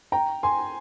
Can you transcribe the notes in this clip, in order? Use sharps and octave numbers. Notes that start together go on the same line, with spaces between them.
G5 A#5
G#5 C6